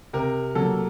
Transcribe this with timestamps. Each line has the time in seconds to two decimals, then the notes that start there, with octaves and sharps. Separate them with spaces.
0.13 C3 A#4
0.55 F#3 A#3 A4